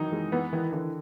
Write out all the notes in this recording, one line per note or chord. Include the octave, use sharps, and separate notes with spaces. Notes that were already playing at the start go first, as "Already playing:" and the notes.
Already playing: D#3 E3 F#3 D#4
E3 G#3
E3 B3
D#3 E3
D3 E3